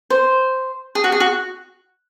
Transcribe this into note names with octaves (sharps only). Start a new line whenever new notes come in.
C5
G#4
F#4
G#4
F#4